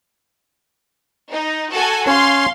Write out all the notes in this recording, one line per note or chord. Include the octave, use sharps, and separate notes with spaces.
D#4
F#4 A4 G#5
C#4 C#5 F5 C6